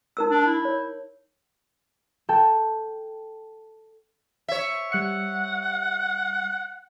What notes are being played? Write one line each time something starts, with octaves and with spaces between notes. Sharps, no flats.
D#4 A#4 E6
D4
E4
C#5
A4 G5
C#5 E5
G3 F#5 F#6 C#7